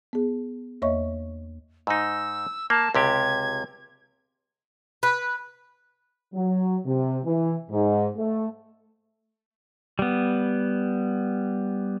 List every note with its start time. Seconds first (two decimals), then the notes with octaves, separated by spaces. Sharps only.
0.13 B3 G#4
0.82 E2 A#3 C#5 D#5 E5 C#6
1.87 G#2 D#4 E6
2.70 A#3 A5
2.95 C#2 C3 G4 G#6
5.03 B4
6.34 F#3
6.86 C3
7.25 E3
7.71 G#2
8.16 A3
9.99 G3 B3